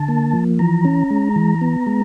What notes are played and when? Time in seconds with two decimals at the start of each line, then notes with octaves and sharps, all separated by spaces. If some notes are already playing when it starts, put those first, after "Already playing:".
Already playing: D3 A5
0.08 A#3
0.33 F3
0.59 E3 A#5
0.85 C#4
1.10 G#3
1.36 E3
1.61 B3
1.87 G#3